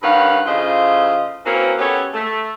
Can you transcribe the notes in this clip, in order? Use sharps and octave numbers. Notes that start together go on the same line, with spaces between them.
G2 D#3 C#4 B4 F5 F#5
A2 C#3 F4 C5 D#5
E3 A#3 C4 C#4 F#4 A#4
B3 C#4 G4 A4 C#5
A3